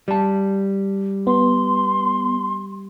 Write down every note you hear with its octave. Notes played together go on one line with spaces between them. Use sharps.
G3 A5
B3 C6